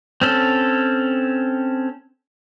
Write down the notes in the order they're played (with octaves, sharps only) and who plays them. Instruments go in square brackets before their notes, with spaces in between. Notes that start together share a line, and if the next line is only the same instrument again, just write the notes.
[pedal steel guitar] C4 C#4 A4